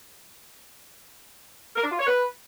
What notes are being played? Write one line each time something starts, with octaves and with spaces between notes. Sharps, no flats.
A#4
D4
F4
C#5
B4